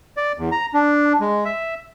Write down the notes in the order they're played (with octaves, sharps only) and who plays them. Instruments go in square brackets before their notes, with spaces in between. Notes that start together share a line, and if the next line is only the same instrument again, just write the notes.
[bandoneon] D5
E2
A#5
D4
G#3
E5